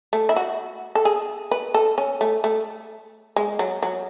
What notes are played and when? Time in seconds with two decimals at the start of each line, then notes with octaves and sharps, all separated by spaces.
0.13 A3
0.29 E4
0.36 F#4
0.95 A4
1.05 G#4
1.51 B4
1.74 A4
1.98 C#4
2.21 A3
2.44 A3
3.36 G#3
3.59 F#3
3.83 F#3